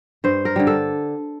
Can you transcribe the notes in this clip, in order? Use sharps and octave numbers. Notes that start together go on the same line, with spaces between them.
G2 C5
A#4
D3 G3
A4